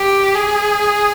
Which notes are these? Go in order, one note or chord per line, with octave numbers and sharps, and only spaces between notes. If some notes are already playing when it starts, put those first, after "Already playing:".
Already playing: G4
G#4